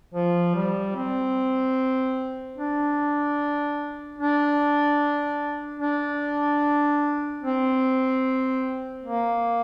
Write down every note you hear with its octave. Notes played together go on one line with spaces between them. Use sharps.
F3
G3
C4
D4
D4
D4
C4
A#3